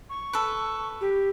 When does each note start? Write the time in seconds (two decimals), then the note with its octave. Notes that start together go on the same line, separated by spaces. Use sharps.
0.10 C#6
0.33 A4 B4
1.01 G4